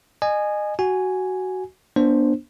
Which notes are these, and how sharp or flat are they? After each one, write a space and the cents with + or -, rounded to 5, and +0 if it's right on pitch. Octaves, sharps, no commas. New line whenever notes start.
D#5 -30 G#5 +0
F#4 +10 G#5 +0
B3 -35 D4 +0 C5 +5